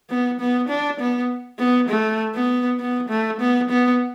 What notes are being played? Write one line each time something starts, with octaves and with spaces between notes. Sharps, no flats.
B3
B3
D4
B3
B3
A3
B3
B3
A3
B3
B3